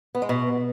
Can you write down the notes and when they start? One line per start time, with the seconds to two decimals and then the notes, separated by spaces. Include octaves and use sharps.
0.15 B3
0.22 G#3
0.29 B2